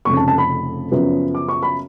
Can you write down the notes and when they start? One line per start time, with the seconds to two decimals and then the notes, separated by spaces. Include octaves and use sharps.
0.05 F1 F2 C#3 C#6
0.17 A5
0.28 A5
0.38 B5
0.91 F#2 C#3 F3 B3
1.35 D6
1.48 C#6
1.63 B5